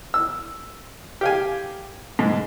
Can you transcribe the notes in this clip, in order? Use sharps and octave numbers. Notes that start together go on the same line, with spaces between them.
E6
G4 F5 G#5
G#2